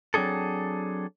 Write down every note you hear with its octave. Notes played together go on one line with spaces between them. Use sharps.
F#3 C4 D4 G#4 A4